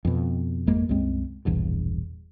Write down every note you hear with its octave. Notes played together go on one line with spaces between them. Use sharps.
F2 B2
G#1 F2 G#3 A#3
C2 F#2 G#3 C4
E1 A#1 E2 G2